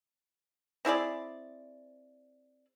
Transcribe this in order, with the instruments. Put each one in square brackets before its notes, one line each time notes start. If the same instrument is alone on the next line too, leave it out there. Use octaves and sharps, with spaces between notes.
[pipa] C4 E4 G#4 D5